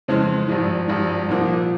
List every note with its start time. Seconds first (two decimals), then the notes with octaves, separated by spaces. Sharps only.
0.08 F2 C#3 E3 G#3 C4
0.48 G#1 G2 F3
0.88 G#1 G2 F3
1.28 C2 A#2 F3 A#3